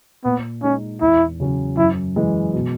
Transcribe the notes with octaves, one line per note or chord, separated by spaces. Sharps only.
A#2 B3
G#3 C#4 D#4
E2 E4
C#3 F#3 C#4
F#2 E4
E3 G#3
B2